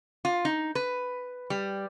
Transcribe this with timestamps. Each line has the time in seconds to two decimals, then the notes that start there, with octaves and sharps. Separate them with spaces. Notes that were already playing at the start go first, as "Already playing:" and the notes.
0.25 F4
0.45 D#4
0.75 B4
1.50 G3